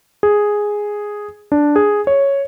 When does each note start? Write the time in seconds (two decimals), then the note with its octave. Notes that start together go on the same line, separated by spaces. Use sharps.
0.23 G#4
1.52 D4
1.76 G#4
2.07 C#5